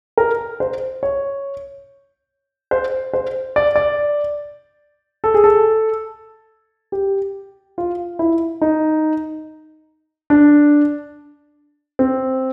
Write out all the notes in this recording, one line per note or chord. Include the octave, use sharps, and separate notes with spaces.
A#4
C5
C#5
C5
C5
D5
D5
A4
G#4
A4
G4
F4
E4
D#4
D4
C4